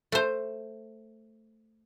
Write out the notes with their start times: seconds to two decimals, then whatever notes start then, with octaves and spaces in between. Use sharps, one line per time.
0.12 A3 C5